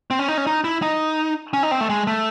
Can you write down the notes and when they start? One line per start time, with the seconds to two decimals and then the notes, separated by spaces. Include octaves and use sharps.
0.11 C4
0.19 C#4
0.28 D#4
0.37 C#4
0.47 D#4
0.64 E4
0.82 D#4
1.53 C#4
1.63 D#4
1.71 C4
1.81 A3
1.90 G#3
2.07 A3